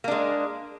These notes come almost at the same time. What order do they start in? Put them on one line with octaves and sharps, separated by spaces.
A#3 D4 G#3